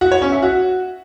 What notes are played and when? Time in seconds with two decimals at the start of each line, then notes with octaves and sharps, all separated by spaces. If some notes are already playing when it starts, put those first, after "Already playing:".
0.01 F#4
0.12 C#5
0.22 C#4
0.32 E5
0.43 F#4